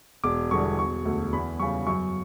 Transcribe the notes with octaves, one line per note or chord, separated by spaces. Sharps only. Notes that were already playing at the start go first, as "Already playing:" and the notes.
E1 D6
E2 D3 G3 C#6
E1 C#6
D2 D3
E2 B5
C#3 G3 C#6
F#2 C#6